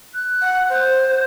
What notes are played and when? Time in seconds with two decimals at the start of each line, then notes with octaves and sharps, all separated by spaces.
0.14 F#6
0.41 F#5
0.69 C5